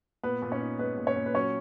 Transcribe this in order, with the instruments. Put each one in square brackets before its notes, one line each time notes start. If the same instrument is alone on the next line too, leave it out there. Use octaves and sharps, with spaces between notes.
[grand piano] A#2 B3 B4
A#2
C#4 C#5
D#4
G#3 B3 B4
A#2
C#4 C#5
A#2
B4
F#3 C#4 C#5